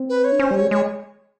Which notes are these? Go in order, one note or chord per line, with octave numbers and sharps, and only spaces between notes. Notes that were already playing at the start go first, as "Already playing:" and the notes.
Already playing: C4
B4
C#5
D4
C#4 C5
G3 C#5
G#3
G#3 C#5